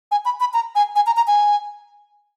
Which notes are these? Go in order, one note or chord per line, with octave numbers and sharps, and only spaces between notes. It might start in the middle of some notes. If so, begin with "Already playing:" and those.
G#5
B5
B5
A#5
G#5
G#5
A#5
A#5
G#5